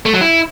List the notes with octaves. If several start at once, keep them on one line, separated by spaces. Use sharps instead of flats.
A3
F#3
E4